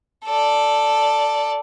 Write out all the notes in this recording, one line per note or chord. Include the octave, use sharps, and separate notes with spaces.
A4 D5